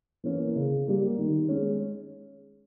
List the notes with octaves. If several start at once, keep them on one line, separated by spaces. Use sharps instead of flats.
E3 A#3 C#4
C#3
G3 A#3
D#3
G#3 C#4